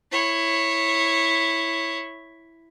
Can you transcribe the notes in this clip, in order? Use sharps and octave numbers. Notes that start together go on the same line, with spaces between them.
E4 C#5